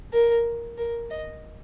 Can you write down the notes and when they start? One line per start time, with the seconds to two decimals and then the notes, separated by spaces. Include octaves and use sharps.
0.13 A#4
0.78 A#4
1.11 D#5